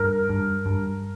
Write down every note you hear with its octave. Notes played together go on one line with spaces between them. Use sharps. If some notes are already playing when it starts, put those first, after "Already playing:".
Already playing: G2 A#4
G2
G2